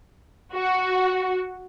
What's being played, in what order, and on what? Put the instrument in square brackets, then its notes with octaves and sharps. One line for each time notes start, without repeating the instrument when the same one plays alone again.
[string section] F#4